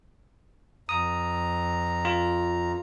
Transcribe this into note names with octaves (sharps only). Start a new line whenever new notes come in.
F2 A#5 D#6
F4